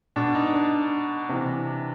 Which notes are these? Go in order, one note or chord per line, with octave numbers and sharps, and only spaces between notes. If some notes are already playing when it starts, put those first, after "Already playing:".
B2 D4
D#4
D4
C3 E3